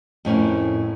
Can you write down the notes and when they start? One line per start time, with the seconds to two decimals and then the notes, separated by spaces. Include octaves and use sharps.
0.25 F2 A2 C#4 A#4